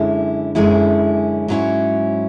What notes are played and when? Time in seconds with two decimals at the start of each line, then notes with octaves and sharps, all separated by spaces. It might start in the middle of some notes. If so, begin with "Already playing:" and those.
Already playing: F#2 D3 G#3 C#4 E4
0.55 F#2 D3 G#3 C#4 E4
1.48 G#2 F#3 C#4 E4